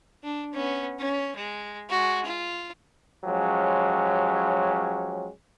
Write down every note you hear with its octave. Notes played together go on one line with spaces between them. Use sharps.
D4
B3 C#4
C#4
G#3
G#3 F#4
F4
F3 F#3 G#3 C#4 G4